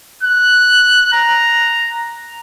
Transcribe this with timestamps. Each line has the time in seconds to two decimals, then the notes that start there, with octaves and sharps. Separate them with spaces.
0.23 F#6
1.13 A#5